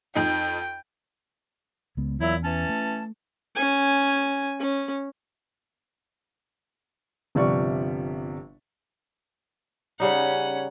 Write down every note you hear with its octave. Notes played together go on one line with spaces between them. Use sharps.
F2 D#4 G5
C#2 G#3 B3
E2 A#2 F#3 E4
E3 C#4 A5
A3
C#4 G#5
C#4
G1 C3 F3 G3 D5 C#6
C#3 G3 C#4 D#4 F#5